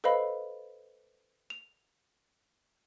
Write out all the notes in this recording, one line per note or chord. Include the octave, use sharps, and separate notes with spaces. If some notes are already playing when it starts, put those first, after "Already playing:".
A4 B4 C5 D#5 F5 B5
F7